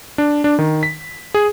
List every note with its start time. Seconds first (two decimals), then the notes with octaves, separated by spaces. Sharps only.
0.18 D4
0.44 D4
0.59 D#3
0.83 B6
1.34 G#4